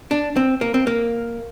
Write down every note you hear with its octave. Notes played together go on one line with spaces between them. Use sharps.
D4
C4
A#3
C4
A#3